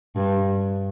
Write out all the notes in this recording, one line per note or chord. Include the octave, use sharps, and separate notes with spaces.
G2